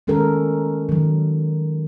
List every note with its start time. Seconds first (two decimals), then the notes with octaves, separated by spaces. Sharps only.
0.07 D#3 G#3 C#4 A4 A#4
0.89 D#3 F#3